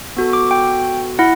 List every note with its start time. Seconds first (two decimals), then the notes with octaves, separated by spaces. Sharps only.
0.17 B3 F#4 A4
0.33 D6
0.51 G5
1.19 E4 F#5